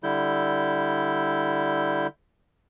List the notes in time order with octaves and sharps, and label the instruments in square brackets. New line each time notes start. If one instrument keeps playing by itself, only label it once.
[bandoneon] D3 G3 E4 G6